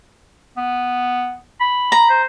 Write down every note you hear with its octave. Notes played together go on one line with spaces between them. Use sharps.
B3
B5
A#5
C5